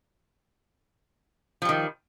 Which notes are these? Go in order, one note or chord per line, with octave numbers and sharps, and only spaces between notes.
D#3 F3 G3